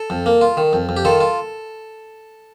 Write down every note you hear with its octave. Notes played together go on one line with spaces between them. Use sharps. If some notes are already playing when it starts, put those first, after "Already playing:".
Already playing: A4
F2
A#3
F4
D#3
F2
F2
G4
D#3 F4 A4
F4